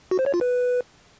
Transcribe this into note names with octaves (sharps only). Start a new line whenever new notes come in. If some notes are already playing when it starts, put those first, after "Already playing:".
F#4
C5
C#5
F4
B4